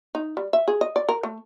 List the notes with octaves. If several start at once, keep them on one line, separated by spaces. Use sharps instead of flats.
D#4
G3
E5
G#4
D#5
D5
A#4
A3